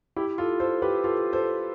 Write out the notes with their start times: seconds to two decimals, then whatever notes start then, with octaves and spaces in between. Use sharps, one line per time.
0.16 E4 G4
0.38 F4 A4
0.60 A4 C5
0.82 G4 B4
1.04 F4 A4
1.33 A4 C5